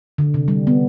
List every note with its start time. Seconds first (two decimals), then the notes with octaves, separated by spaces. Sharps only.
0.18 D3
0.34 C3
0.48 G3
0.67 B3